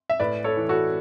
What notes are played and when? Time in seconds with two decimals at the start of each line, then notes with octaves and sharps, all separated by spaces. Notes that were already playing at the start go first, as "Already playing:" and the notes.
0.10 E5
0.20 A2 B4 D5
0.44 A4 C#5
0.57 E3
0.69 F#4 A4